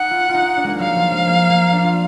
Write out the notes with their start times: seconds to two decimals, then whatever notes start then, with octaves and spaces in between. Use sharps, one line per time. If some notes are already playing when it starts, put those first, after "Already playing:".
Already playing: D#4 F#5
0.11 F4
0.29 F4
0.34 D#4
0.57 D4
0.64 G#3 A#3
0.79 F#3 F5
0.96 F3
1.11 G#3
1.26 A#3
1.50 A#3
1.73 D4
1.84 F4